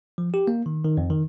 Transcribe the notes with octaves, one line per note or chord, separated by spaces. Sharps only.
F3
G4
A#3
D#3
D#3
F2
D#3